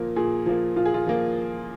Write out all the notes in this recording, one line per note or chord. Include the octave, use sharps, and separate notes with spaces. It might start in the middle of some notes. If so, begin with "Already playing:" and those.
Already playing: A#2 F3 A#3
A#2 G#4
F3 A#3
A#2 F4
G#4
F4
F3 A#3